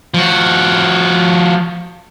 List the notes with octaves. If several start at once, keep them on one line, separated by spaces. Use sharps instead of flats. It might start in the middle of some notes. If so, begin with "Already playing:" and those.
F3 F#4